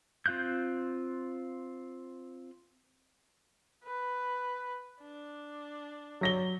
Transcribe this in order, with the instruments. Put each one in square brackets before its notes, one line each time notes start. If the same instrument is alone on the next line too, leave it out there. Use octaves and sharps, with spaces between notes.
[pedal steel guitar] C4 F4 F5 F#6 G6
[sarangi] B4
D4
[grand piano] F#3 A#6 G7